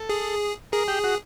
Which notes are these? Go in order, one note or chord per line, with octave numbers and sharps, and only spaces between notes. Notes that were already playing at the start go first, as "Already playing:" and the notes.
Already playing: A4
G#4
G#4 A#4
G4
F#4